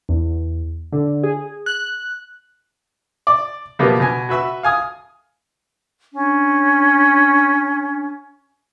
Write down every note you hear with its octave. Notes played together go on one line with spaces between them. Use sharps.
E2
D3
G#4
F#6
D5
B2 F3 G3 A#3 B3
B2 G#5
F#4 B4 E5 E6
F5 G#5 D#6
C#4 D4